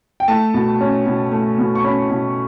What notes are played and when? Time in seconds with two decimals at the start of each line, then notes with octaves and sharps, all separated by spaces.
0.20 G5
0.28 A3 A5
0.54 B2
0.81 C#4
1.06 B2
1.32 A3
1.58 B2
1.75 C#6
1.84 C#4 B5
2.10 B2